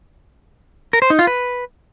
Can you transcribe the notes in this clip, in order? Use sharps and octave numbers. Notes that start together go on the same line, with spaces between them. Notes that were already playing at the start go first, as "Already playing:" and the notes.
A#4
C5
D#4
F4
B4